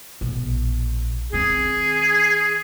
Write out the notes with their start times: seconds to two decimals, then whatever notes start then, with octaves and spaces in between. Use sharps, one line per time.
0.21 A#1 B2
1.33 D#3 C4 G#4